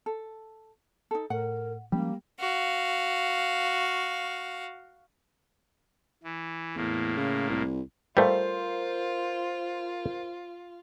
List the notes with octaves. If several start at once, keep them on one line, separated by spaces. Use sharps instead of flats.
A4
D#4 A4
A2 A#4 F#5
F3 G3 G#3 A#3 C#4
F#4 F5
E3
E2 A2 A#3
C#3
C2
G3 A3 F4 A#4 C5 F5